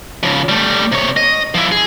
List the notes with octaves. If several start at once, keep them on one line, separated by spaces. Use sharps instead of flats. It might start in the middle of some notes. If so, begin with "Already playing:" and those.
C#3 F3
G3 A3
C3 C#5
D#5
F3 E4
G#4